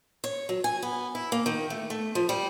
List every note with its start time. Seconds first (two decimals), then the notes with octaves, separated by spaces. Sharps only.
0.24 C#5
0.49 F#3
0.64 G#5
0.82 B3
1.15 E4
1.32 A#3
1.46 D#3
1.70 A3
1.90 A3
2.15 F3
2.29 G3